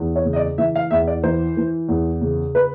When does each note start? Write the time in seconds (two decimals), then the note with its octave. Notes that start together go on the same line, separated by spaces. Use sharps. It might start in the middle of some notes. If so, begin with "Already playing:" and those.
Already playing: E2
0.16 C#5
0.25 C#3
0.33 D#5
0.36 D5
0.58 E3 E5
0.76 F5
0.91 E2 E5
1.08 D5
1.23 E3 C5
1.57 E3
1.89 E2
2.21 C#3
2.55 B4